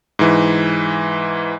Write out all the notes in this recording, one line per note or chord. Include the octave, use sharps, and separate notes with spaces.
G#2 E3